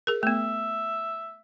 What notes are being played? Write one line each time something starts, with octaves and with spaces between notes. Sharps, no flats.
G#4 A#4
A3 B3 E5